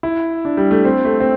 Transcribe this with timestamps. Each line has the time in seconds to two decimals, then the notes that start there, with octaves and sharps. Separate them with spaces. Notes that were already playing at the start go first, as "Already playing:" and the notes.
0.03 E4
0.45 D4
0.57 G3
0.71 A3
0.85 C4
1.05 A3
1.20 C4